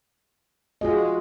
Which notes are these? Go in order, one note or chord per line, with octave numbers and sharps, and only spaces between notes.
G#3 F4 F#4 D#5